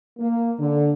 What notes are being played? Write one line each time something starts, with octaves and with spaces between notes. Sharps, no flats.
A#3
D3